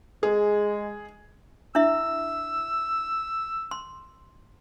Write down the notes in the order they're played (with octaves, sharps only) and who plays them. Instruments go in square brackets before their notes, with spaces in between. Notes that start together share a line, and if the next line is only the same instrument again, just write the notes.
[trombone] G#3 [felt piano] G#4
[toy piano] D4 E4 E5 [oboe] E6
[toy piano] C6